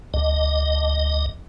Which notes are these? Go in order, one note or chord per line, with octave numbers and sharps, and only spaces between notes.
D2 D#5